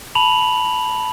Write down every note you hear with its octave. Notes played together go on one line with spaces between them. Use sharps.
A5 B5 F7 F#7